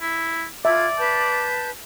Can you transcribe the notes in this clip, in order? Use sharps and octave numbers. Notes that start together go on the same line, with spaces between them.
E4
F4 D5 E5 G#6
B4 A5 G6